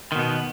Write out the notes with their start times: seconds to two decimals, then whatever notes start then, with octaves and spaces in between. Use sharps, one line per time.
0.12 D#3
0.15 B2
0.19 B3